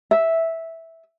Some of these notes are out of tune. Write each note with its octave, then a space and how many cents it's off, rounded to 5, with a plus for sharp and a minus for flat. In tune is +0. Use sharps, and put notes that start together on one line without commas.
E5 -5